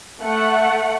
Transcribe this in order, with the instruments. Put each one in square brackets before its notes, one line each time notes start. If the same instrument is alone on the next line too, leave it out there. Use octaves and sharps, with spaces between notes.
[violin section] A3 F#5